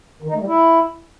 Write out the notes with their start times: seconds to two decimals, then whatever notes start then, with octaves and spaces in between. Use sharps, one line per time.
0.22 D#3
0.29 D#4
0.35 A3
0.41 G3
0.47 E4